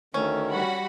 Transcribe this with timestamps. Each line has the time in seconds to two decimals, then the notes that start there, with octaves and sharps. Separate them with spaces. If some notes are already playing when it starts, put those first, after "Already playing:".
0.14 D2 D#3 A3 C#4
0.50 G3 F#4 F#5 B5